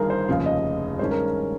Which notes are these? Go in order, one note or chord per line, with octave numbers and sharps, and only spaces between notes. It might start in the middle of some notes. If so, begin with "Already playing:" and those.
Already playing: G1 G2 D#3 A#3 G#4 A#4
C5
F1 D#2 C#3 F3 F5
D#5
G2 D#3 G#3 C#4 C5
A#4